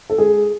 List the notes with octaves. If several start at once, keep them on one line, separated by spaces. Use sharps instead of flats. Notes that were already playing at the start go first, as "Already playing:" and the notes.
A4
G#3 G#4